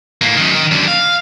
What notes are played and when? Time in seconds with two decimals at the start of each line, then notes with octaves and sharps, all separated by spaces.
0.22 A2 A#3
0.36 F#2 D#3
0.55 D#3
0.71 F#2 D3
0.88 F5